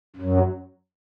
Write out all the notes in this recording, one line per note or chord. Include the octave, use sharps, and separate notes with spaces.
F#2
F#3